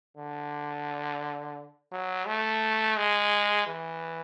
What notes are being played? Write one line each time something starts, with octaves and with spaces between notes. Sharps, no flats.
D3
F#3
A3
G#3
E3